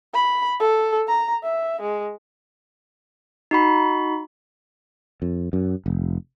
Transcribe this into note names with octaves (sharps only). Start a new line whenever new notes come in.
B5
A4
A#5
E5
G#3
D#4 F#4 B5
F2
F#2
F1